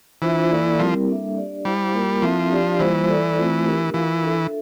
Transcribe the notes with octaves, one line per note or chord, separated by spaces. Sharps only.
E3 D4 F4 C5 E5
A#3 E4 A4 D5 F5
F3 G3 C4 E4 G4 A#4
G3 A#3 D4 A4 E5
D4 G4 D5
G3 E4 G4 C5 F5
A#3 F4 A#4
F3 C4 E4 A4 E5
D4 G4 D5 F5
E3 G3 A#3 F4 C5
E4 A4 D5
A3 C4 F4 C5
D4 G4 A#4
E3 F4 A#4 F5
D4 A4 E5